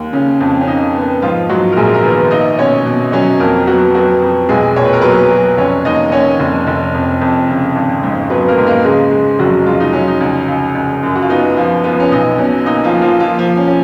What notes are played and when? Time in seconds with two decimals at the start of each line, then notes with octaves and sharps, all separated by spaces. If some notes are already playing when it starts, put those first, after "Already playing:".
Already playing: D#2
0.13 C#3 C#4
0.41 F2
0.61 C#4
0.68 C#3 D#4
0.95 B3
1.22 G#2 F3 F4
1.49 G#2 F#3 F#4
1.72 A#4
1.77 A#1 G#3 G#4
1.94 A#4
2.04 D#3 B3 B4
2.31 A#3 D#4 D#5
2.59 B2 C#4 C#5
2.86 B2
3.12 F#3 C#4 C#5
3.40 F2 A#3 A#4
3.67 F#3 B3 F#4
3.95 F#3 B3 F#4
4.22 F2
4.49 B1 G#3 G#4
4.76 A#2 C#5
4.85 B4
4.93 A#4
5.01 F#3 B3 B4
5.31 F#3
5.57 F1 C#4 C#5
5.85 D#2 D#4 D#5
6.12 D#2 C#4 C#5
6.39 F1
6.67 F1
6.94 F2
7.21 F2
7.49 C#3
7.75 G#1
8.03 G#2
8.30 F#3 B3 B4
8.48 A#3 A#4
8.58 G#2
8.67 A#3 A#4
8.84 C#3 G#3 G#4
9.11 G#3
9.39 F1 F#3 F#4
9.66 G#3 F4
9.80 D#4
9.93 F#3 C#4
10.07 D#4
10.21 C#2
10.48 C#2
10.75 C#2
11.03 F#2
11.15 F#4
11.22 F4
11.30 B3 D#4
11.57 F3 F4
11.84 F3 B3 F4
12.00 C#4
12.11 B1 D#4
12.38 B2 C#4
12.66 A#3 D#4
12.84 F3 F4
12.93 A#3
13.02 F3 F4
13.20 F3 A#3 F4
13.38 F3 F4
13.48 A#3
13.57 C#4
13.67 C#4